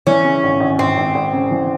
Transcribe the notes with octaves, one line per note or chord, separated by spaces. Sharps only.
E3 C#4
C#3
G#1
G#1
G#1 C4
G#1
G#1
C#3
E3